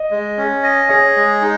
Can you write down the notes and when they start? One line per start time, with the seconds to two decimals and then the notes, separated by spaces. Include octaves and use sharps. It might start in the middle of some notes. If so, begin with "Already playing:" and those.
Already playing: D#5
0.11 G#3
0.37 C#4
0.63 D#5
0.89 G#4 C#5
1.16 G#3
1.42 D#4